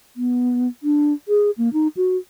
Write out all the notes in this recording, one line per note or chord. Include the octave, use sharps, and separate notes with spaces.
B3
D4
G#4
A#3
D#4
F#4